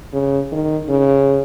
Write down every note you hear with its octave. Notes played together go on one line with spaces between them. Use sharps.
C#3
D#3
C#3